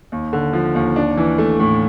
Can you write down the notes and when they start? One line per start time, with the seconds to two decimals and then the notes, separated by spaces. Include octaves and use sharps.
0.12 D#2
0.33 D3
0.53 F3
0.75 D#2
0.96 D4
1.17 E3
1.38 A3
1.60 A2